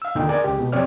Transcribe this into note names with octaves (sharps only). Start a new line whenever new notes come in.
F5 E6
D#2 A#2 D3 D#4 G5
G#4 A#4 D5 G#5
C#2 G#3 G4
B2
F2 C3 C4 C#5 D5 F6